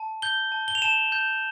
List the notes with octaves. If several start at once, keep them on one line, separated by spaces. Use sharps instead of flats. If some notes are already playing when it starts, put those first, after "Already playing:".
Already playing: A5
G6 G7
A5
G7
F7
A5 E7
F7
G6